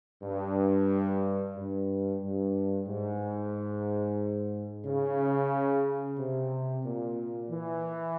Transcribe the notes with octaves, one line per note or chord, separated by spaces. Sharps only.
G2
G2
G2
G#2
C#3
C3
A#2
E3